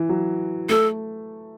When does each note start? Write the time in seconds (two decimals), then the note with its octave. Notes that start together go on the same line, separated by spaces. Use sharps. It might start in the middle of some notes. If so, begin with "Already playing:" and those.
Already playing: E3
0.09 F#3
0.69 A3 A4